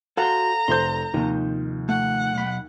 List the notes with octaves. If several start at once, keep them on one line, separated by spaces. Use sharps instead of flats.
F#4 A4 C5 F5 F#5 A#5
F1 C5 C6 G6
D#2 C3 D#3 F3
A3 F#5
B1 B5